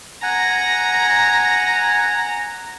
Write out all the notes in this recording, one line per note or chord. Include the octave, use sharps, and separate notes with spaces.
F#5 G#5 A#5